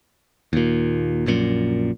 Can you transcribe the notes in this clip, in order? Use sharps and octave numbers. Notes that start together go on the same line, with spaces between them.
D#2 A#2
A#1 F#2 A#2